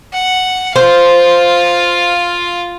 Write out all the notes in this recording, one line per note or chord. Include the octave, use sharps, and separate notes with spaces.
F#5
F4 C5 F5